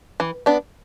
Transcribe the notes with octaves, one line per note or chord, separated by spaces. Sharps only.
E3
B3 D4